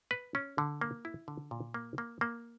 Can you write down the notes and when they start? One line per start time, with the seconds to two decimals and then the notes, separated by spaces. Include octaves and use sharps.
0.11 B4
0.35 C#4
0.58 D3
0.81 A#3
1.05 E4
1.28 D3
1.51 A#2
1.74 A#3
1.98 A#3
2.21 A#3